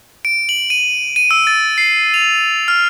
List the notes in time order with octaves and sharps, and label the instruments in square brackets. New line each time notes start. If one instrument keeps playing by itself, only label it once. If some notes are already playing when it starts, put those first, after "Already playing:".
[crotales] D7
F#7
D#7
D#7
E6
A6
C7
F7
F6